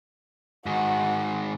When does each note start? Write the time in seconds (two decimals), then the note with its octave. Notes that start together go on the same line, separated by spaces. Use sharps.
0.66 G#2 D#3 F#4